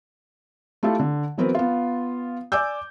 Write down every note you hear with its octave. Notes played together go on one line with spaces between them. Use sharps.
A3 E4 F4 G4 A4
D3
E3 F#3 B3 C4 A#4 B4
B3 F4
D5 G#5 D6 E6 G6